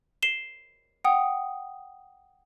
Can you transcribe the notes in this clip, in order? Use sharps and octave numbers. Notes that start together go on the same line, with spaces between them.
C7 E7 G7
F#5 G5 D#6